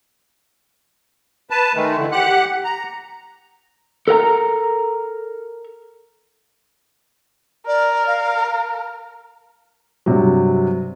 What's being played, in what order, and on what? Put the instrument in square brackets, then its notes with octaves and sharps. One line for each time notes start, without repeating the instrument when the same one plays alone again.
[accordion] B4 A5
D#3 G#3 A3
D3 E3
G4 F#5 F#6
A#5
[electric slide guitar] A4 A#4 F#5 A#5
[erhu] A#4 [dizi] D5
[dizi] F5
[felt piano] G2 C3 F#3